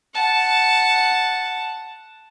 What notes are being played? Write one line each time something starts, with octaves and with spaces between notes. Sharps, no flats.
F#5 A5